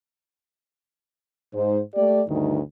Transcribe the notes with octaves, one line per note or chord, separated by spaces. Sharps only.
G#2 C5
A3 G4 D5
D2 G2 D#3